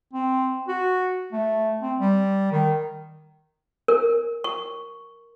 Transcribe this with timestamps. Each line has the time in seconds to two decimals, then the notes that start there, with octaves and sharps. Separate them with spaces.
0.13 C4
0.68 F#4
1.33 A3
1.82 C4
2.00 G3
2.52 D#3
3.88 A#4
4.44 C#6